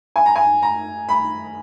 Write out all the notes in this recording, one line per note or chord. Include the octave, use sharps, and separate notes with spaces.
G#5
A#5
G#5
A#5
B5